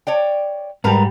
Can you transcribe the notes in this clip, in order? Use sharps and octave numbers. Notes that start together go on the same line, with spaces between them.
C#5 D5 G5
G#2 G3 A#4 B4 A#5